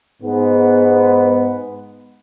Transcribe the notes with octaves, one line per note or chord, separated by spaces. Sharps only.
G#2 B3